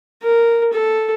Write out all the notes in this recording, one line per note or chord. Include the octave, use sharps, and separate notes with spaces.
A#4
A4